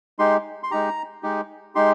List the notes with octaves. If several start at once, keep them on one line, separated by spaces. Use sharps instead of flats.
G#3 D#4 G4 C6
C6
G#3 D#4 G4 A#5
G#3 D#4 G4
G#3 D#4 G4 C6